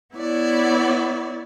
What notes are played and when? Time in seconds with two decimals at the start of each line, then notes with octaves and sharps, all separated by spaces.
0.14 B3 E4 C#5 D5